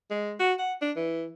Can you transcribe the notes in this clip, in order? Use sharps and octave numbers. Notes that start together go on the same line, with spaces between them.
G#3
F#4
F#5
D4
E3